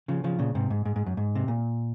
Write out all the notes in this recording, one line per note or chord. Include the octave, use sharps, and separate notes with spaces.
C#3 F3
C#3 F3
A#2 C#3
G#2 C3
G#2
G#2
G#2
F#2
G#2
C3
A#2